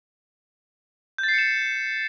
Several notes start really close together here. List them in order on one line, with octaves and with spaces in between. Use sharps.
G6 A6 C7 C#7 E7